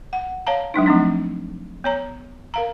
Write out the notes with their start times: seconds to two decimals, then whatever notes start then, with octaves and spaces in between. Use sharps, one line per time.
0.13 F#5
0.47 C#5 F5 A5 A#5
0.74 F#3 G#3 D4 D#4
0.86 F3 A3 C4 D4
1.84 B3 C#5 A#5
2.54 A#4 F5 A#5